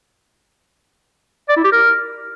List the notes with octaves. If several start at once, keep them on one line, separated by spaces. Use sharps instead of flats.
D5
E4
G4
A#4